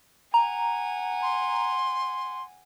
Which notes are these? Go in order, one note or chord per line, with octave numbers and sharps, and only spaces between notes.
F#5 G#5 A#5
C6